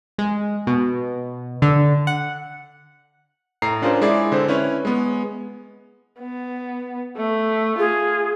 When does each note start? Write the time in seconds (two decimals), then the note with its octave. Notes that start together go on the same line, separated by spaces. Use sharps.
0.19 G#3
0.67 B2
1.62 D3
2.07 F#5
3.62 A2 A#5 C7
3.82 C#4 D4 F4 G#4 A#4 C5
4.01 G#3 E4 G#4 D5
4.32 D3 C4 C5
4.48 C#4 E4 B4 C#5
4.85 G#3 B3
6.20 B3
7.17 A3
7.79 F4 G#4